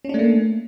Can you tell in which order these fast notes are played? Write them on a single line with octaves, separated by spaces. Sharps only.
C#4 D4 A3 A#3